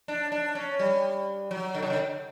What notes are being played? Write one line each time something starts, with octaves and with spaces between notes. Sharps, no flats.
D4
D4
C#4
G3
F#3
D3
C#3
D3